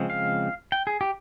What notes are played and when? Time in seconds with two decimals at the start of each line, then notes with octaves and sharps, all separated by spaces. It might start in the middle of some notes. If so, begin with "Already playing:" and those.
Already playing: C#3 F3 G#3 C4
0.10 F5
0.72 G5
0.87 G#4
1.01 G4